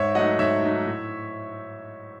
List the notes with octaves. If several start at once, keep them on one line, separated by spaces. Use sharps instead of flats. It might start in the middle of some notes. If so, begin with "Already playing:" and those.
Already playing: G#2 C#5 E5
F#3 A3 D#4 D#5 F#5
G#2 C#5 E5
F#3 A3 D#4
A2